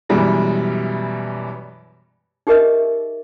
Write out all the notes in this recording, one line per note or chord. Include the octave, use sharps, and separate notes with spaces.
F#2 B2 E3 G3 G#3
D#4 G4 G#4 A#4 D#5 E5